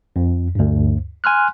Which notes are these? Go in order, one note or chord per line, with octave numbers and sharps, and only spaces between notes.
F2
D2 G2
G#5 C6 F6 F#6